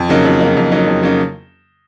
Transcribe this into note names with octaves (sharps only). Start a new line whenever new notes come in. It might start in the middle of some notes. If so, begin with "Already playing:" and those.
Already playing: F2
C#3 F#3 A#3 D#4
F2
C#3 F#3 A#3 D#4
F2
C#3 F#3 A#3 D#4
F2
C#3 F#3 A#3 D#4